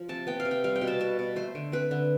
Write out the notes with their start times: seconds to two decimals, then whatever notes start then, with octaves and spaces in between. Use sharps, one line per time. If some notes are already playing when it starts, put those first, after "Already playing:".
Already playing: F3
0.09 C3 A5
0.27 B3 G5
0.40 F5
0.45 C3
0.51 G5
0.64 G3 F5
0.76 G5
0.81 B2
0.87 A5
1.00 B3 A5
1.19 B2
1.36 A3 C5
1.55 D3
1.72 C4 B4
1.91 D3